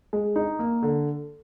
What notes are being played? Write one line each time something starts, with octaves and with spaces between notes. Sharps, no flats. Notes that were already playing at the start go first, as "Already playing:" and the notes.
G#3
D#4
A#3
D3